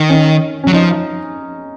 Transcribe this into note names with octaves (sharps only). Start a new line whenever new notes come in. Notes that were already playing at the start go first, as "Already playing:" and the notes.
Already playing: D#3
C#4
F#3 C#4
F3 D#4